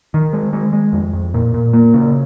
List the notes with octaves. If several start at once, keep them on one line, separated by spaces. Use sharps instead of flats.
D#3
G#3
G#3
G#3
F2
F2
A#2
A#2
A#3
C#3